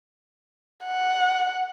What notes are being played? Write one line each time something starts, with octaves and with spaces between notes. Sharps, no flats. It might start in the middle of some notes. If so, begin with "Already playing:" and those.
F#5